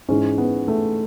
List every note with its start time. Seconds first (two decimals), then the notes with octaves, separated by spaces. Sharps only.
0.09 G#2 E3 G#3 C#4
0.38 B3
0.68 A3